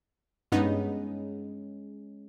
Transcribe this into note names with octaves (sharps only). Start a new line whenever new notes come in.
G2 G#3 B3 C#4 D#4